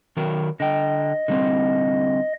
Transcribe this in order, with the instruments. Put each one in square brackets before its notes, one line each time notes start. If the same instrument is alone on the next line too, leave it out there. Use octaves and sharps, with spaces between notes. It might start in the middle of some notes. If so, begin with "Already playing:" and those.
[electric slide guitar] D#3 F#3 A#4
[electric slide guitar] D3 G5 [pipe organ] D#5
[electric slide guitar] D3 G3 C4